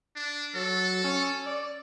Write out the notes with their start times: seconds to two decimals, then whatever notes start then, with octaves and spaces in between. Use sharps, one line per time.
0.15 D4
0.55 F#3 A4
1.04 C#4
1.46 D5